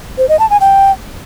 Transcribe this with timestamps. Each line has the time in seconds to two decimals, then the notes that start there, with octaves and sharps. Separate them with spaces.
0.18 C5
0.29 D#5
0.39 A5
0.50 G#5
0.61 G5